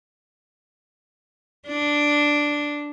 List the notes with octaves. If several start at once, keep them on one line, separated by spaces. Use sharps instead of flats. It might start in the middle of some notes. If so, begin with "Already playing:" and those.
D4